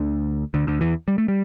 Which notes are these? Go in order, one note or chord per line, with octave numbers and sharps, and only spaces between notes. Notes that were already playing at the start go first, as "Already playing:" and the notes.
Already playing: D2 D3
D2 D3
D2 D3
E2 E3
G3
A3
G3